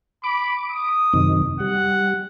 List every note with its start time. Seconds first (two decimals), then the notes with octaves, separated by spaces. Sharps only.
0.24 B5 D6
0.71 D#6
1.13 F#2 C3 D#3
1.60 G3 F#5